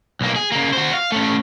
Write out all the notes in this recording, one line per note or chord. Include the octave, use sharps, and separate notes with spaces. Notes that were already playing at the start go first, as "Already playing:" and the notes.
B1 A#3
G#4
C#3 A#3
F#4 C5
F5
A3 C#4